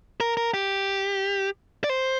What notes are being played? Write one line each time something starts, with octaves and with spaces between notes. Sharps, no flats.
A#4
A#4
G4
D5
C5